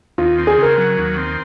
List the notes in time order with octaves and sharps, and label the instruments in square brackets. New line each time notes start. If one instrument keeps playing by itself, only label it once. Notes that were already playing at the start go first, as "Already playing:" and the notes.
[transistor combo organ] D#2 [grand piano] F4
[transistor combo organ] C4
[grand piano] G#4
[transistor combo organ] C#3 [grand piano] A#4
[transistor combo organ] F#3
D#2
C4